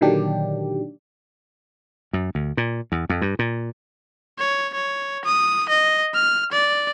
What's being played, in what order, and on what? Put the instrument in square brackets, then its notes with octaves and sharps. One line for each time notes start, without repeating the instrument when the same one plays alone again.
[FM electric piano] A#2 D3 D#3 F#3 D4 G4
[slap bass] F#2
D2
A#2
E2
F2
G2
A#2
[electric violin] C#5
C#5
D#6
D#5
F6
D5